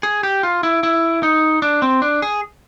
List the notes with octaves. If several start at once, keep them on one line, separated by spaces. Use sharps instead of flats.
G#4
G4
F4
E4
E4
D#4
D4
C4
D4
G#4